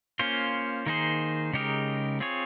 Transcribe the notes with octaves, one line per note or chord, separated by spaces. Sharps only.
A#3 C#4 F4 C5
D#3 A#3 D#4 G#4 C5
C#3 G#3 D#4 G4 A#4
C4 F4 G#4 C#5